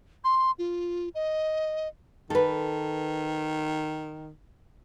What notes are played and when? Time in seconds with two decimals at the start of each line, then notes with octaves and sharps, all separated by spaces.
0.24 C6
0.59 F4
1.15 D#5
2.30 D#3 A4 B4